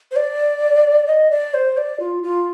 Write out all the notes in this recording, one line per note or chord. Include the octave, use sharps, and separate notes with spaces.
C5
D5
D#5
D5
C5
D5
F4
F4